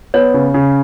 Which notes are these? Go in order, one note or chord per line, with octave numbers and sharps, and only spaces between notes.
B3 C#5
C#3
C#3